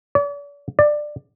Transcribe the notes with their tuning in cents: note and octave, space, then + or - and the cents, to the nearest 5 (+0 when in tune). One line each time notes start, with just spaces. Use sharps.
D5 -45
D5 +15